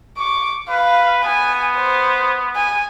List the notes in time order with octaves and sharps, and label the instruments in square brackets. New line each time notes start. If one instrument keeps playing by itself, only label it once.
[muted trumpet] C#6 [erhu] D6
[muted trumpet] B4 [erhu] F5
[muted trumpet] B3 [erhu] G#5
[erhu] C5
G#5